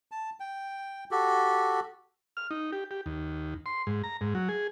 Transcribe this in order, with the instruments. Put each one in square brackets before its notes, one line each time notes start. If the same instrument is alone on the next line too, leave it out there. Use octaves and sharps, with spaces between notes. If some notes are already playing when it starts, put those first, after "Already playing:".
[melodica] A5
G5
F#4 G4 A4
[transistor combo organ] F6
D#4
G4
G4
D#2
C6
G#2
A#5
G#2
F#3
G#4